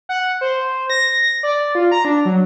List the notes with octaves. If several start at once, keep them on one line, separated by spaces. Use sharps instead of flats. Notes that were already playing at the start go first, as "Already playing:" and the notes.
F#5
C5
A#6
D5
F4
A#5
D4
F#3